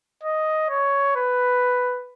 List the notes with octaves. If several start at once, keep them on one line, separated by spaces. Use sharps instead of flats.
D#5
C#5
B4